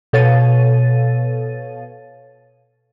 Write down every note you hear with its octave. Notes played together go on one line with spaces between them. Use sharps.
B2 A4 C#5 F5 A6 D#7